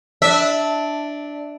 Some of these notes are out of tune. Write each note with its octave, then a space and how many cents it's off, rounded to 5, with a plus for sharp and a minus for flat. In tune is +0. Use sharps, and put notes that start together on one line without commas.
D4 +0 E5 -20